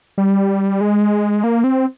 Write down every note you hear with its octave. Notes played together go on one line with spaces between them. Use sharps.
G3
G#3
A#3
C4